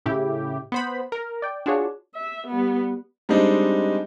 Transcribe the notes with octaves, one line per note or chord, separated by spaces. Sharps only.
A2 C#3 E4 G4
B3 C5 B5
A#4
D5 G5
D4 F4 F#4 G#4 C#5
E5
G3 B3
G3 G#3 C4 D4 D#4